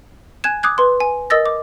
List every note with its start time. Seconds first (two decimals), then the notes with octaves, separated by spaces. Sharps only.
0.44 G#5 F#6 G#6 E7
0.63 D6 D#6 F#6 G#6
0.78 B4 C6
1.00 G#5
1.30 A#4 D#5 D#6 E6 A6 A#6
1.46 D6